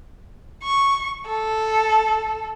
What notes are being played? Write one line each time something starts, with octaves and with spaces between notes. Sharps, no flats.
C#6
A4